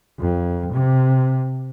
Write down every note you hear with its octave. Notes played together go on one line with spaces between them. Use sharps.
F2
C3